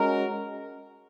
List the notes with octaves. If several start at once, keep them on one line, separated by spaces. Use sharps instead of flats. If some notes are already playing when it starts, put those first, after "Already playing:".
Already playing: G#3 C#4 F#4 A#4